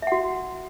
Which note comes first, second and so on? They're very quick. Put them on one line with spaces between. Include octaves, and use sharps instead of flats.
E5 F#5 F#4